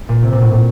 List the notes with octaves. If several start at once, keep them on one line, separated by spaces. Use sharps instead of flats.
A#2
C3
A#2
A2
A#2